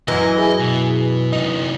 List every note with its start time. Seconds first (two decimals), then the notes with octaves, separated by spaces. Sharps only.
0.08 F#2 E3 D#5
0.36 E4 G#4 B4
0.59 B2
1.32 C3 D#4 D#5